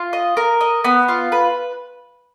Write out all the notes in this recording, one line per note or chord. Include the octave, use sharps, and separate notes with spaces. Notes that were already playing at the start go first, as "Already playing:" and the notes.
Already playing: F4
D#5
A#4
D#5
B3
F4
B4